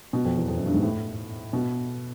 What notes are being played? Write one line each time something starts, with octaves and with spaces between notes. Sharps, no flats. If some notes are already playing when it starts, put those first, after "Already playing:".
B2
F2
E2
F2
F#2
G2
G#2
A2
B2